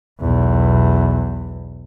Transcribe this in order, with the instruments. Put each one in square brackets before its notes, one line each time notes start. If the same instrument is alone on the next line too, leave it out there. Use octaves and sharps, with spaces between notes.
[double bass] B1 E2